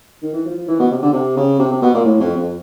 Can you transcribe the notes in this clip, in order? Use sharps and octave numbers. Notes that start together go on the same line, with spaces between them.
D#3
E3
F3
F3
E3
B2
C3
D3
C3
C#3
C3
C3
B2
A#2
A2
F2
F2